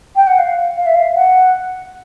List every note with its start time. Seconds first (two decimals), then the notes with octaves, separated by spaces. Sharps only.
0.16 G5
0.27 F#5
0.38 F5
0.77 F5
0.86 E5
0.95 F5
1.15 F#5